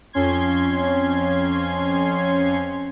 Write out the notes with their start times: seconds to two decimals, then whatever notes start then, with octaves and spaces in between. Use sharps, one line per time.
0.13 F2 C#4 C6 G#6